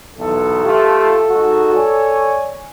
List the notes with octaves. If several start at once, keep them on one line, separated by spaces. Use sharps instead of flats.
B1 E2 A4
A3 F4 G4
G#2 F#4
C#5 D5 G#5